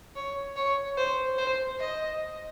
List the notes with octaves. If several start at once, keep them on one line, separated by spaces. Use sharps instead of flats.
C#5
C#5
C5
C5
D#5